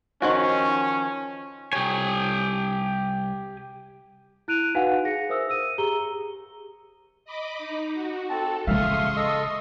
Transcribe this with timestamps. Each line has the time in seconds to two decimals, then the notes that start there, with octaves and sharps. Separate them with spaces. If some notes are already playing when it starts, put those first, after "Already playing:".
0.22 D#3 F3 C#4 F#4
1.73 C2 G4 C#5 G#5
4.48 E4 F#6 D7 D#7 F7
4.75 D#4 F#4 B4 F5 F#5 G#5
5.05 G#4 A#6 C#7
5.29 A#4 C5 E5 D#6 E6
5.49 E6 D#7
5.78 G4 G#4 A#5 G7
7.25 D#5 B5 D6
7.58 D#4
7.94 F#4
8.30 C4 A4 A5
8.67 C#3 G#3 E5 F5 C6 C#6 D#6
9.17 A4 D#5 E6